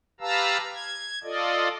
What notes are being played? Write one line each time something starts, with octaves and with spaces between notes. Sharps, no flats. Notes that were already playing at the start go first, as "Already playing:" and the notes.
G4 B4 F5 A5 A#5 E6
G#6
F4 A4 D5 D#5